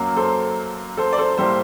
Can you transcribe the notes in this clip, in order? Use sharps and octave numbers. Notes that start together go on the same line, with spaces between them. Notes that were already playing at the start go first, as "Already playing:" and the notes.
Already playing: F#2 F#3 A#3
A4 C5
A4 C5
D5
A4 C5
A2 G3 A#3 A4 C5